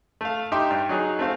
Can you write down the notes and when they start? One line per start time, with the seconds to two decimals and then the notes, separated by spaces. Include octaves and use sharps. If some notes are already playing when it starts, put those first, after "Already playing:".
0.21 A3 F5
0.52 D#4 G4 E5 G5 C6
0.71 G2
0.89 F#3 D#4 G#4
1.19 A3 C4 F5